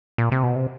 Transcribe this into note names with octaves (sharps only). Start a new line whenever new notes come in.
A#2
C3
B2
C3